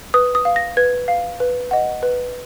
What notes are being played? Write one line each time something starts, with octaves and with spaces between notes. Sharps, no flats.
B4 D#6
D#6
F5
A#6
B4 G#6
F5
B4
D#5 F#5
B4